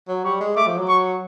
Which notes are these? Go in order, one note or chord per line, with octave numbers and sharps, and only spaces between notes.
F#3
G3 C#6
G#3
A3 D6
F3
F#3
C#6